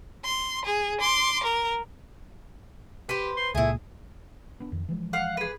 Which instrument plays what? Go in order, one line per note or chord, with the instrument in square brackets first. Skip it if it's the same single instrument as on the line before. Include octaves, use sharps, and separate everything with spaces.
[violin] C6
G#4
C6 D6
A#4
[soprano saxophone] G4 [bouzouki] B4 C5
[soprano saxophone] C6
[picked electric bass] C#2 A#2 [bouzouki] A3 E4 [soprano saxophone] G#4
[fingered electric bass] B3 D4
F2 D#3
E3 F3 G#3
[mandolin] F5 F#5
G#4 B4